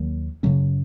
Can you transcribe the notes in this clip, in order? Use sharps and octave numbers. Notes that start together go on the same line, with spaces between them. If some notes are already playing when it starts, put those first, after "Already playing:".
Already playing: D#2 D#3 F#3 A#3
F#2 C#3 F#3 C#4